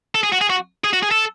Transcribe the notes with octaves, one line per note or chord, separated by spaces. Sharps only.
A4
G#4
F#4
G#4
F#4
G#4
F#4
G#4
A4